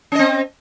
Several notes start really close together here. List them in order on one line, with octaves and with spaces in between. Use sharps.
C#4 D#5 C4